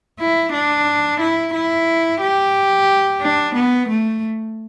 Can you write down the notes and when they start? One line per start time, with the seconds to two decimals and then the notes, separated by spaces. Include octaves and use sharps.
0.19 E4
0.53 D4
1.20 E4
1.54 E4
2.21 G4
3.22 D4
3.55 B3
3.89 A3